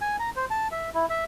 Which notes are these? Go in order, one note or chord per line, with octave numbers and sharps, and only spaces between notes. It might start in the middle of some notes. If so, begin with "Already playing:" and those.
G#5
A#5
C5
A5
E5
E4
E5